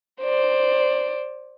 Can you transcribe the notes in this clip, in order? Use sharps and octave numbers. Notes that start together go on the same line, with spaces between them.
C5 D5